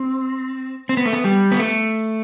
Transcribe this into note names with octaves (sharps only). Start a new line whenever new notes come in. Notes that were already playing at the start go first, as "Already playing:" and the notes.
Already playing: C4
C4
B3
A3
B3
G3
B3
A3